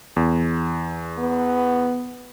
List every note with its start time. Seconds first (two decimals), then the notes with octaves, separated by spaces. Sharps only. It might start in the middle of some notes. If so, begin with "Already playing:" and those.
0.16 E2
1.19 B3